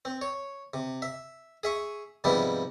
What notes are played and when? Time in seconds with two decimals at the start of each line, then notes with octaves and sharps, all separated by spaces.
0.05 C4
0.21 C#5
0.74 C3
1.02 E5
1.63 G#4 E5 C#6
2.24 G#2 C3 F3 G3 B3 E4